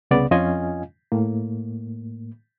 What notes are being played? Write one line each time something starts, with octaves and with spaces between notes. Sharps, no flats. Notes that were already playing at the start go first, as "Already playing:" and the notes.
C2 C#3 B3 D5
F2 C#4 F4 D#5 F5 G#5
A2 A#3